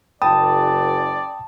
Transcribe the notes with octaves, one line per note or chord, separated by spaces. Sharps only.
F#1 D5 G5 A5 B5 D#6